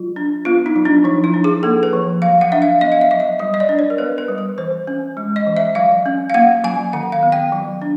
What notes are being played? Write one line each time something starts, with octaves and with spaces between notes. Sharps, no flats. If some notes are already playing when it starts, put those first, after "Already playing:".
Already playing: F#3 F4
D4
B3 F4
D#4
F#3
D4
F3 D#4
E4
D4
G#4
A#3 A4
B4
F3
F#3 F5
F#5
D4 E5
F5
B3 D#5
F5
E5
F#3 D#5
E5
G3 D#5
D#5
D5
D4
C#5
A#4
B3 B4
B4
G3
B4
E3 C5
C#4
G#3
D#5
E3
E5
F#3 F5
C#4
F5
A#3 F#5
F#3 G#5
D#3 F#5
F5
B3
G5
F#3
D4